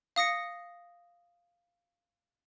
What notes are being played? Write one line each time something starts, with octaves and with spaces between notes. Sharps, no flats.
F5 D#6 A#6 C#7